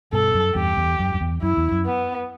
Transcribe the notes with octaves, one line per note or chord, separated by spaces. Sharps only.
G2 B2 A4
F#2
E2 G2 G4
E2
F#2
F#2
E2
F#2 E4
E2
F#2
B3